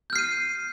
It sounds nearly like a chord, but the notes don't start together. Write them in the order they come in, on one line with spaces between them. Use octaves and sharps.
G6 F6 C7 D#7